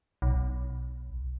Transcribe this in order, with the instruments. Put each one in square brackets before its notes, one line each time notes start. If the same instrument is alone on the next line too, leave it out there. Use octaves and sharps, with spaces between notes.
[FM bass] B1